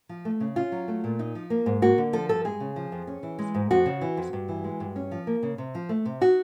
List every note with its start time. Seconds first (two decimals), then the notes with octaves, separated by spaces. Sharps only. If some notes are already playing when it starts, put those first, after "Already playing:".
0.09 F3
0.25 A3
0.40 C#3
0.56 C#4 F4
0.72 F#3
0.88 A3
1.04 A#2
1.19 D#4
1.35 F3
1.50 A#3
1.66 G#2
1.82 A#3 F#4
1.98 D3
2.13 F3 A4
2.29 G2 A4
2.45 G#3 G#4
2.60 C#3
2.76 F3
2.92 F2
3.07 C#4
3.23 E3
3.39 G#3
3.54 G#2
3.71 F2 F#4
3.86 C#3
4.01 E3
4.17 F2
4.33 G2
4.49 E3
4.64 G#3
4.80 G2
4.96 C#4
5.11 F3
5.27 A#3
5.43 C#3
5.58 C3
5.75 F3
5.89 A3
6.06 C3
6.21 D#4 F#4